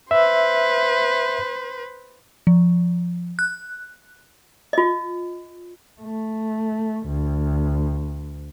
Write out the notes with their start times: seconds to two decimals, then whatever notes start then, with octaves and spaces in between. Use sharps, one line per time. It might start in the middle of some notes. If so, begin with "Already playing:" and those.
0.11 B4 C5 E5
2.47 F3
3.39 F#6
4.73 F4 D#5
6.01 A3
7.07 D2